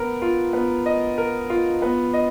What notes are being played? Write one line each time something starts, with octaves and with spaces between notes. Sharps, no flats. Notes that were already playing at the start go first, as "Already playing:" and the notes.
Already playing: B3 A#4
F4
B3
D#5
A#4
F4
B3
D#5